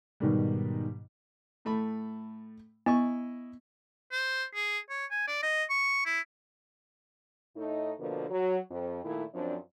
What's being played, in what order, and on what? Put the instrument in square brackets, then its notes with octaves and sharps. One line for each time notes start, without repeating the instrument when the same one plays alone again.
[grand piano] G#2 B2 D#3 G3
[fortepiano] A2 A3 B5
[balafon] B3 [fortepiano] E4 D#5 C#6
[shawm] C5
G#4
C#5
G#5
D5
D#5
C#6
E4
[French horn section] A2 A3 D#4
B2 D3 F3 A#3
F#3
F2
A#2 D#3 A3 E4
F#2 F3 C4 D4 D5